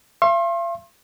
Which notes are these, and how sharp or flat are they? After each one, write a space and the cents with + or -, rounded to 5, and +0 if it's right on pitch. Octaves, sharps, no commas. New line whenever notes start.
F5 -45 C6 +40